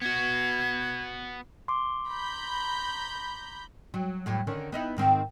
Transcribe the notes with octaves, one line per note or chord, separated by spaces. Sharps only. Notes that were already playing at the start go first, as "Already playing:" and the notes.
B3 F#4 G#6
C6 D6
A#5 B5 G6
F#3
E2 A2 F#3
D3 D#3 C#4
B3 D#4 E4
G#2 D#3 C4